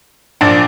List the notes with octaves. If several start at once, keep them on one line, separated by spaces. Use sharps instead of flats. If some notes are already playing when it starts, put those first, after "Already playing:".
A#1 A#2 F3 D4